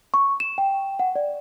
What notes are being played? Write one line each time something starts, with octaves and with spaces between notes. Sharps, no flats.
C#6
E7
G5
F#5
D5